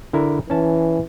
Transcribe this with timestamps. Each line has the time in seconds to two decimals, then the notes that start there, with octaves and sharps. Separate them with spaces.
0.13 D3 E4 A#4
0.50 E3 C#4 A5